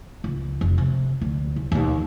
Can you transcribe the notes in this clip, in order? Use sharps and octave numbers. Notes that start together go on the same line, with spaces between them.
C#2
F1
C3
D2
C2
D#2 B2